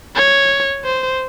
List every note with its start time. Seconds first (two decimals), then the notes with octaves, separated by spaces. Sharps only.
0.16 C#5
0.85 C5